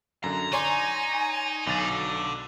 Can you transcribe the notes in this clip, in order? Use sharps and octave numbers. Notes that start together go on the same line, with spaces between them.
F#2 D3 A#5
D#4 C#5 D5 G#5 C6
B1 D3 A6